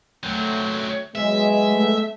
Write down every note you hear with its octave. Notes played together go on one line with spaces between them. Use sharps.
F#3 A3 C4
F#3 G#3 B3 D#5 E5
A3